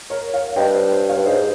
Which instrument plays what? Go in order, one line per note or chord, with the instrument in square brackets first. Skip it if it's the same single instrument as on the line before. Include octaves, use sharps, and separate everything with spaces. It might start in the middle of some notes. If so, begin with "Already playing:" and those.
[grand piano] A#4 C#5
C#5 F5
[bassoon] G2 [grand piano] D#5 G5
[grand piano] C5
C5
C#5 F5
[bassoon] G2
[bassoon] G#2 [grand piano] C5 D#5